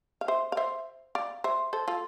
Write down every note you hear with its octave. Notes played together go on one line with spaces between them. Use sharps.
F5
C5 E5
F5
C5 E5
D5 F5
C5 E5
A4 C5
F4 A4